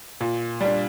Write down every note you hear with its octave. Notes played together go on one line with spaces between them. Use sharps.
A#2
G3 D4